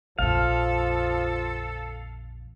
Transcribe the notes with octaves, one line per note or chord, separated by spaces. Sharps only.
A#1 F2 F3 A4 F5